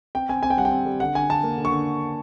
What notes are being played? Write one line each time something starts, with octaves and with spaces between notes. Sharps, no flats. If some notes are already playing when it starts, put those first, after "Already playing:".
C4 G5
C4 G#5
C4 G#5
G5
G3 F#5
G5
C4
G3
D3 F#5
D3 G#5
D3 A5
A#3
D3
C#6
D3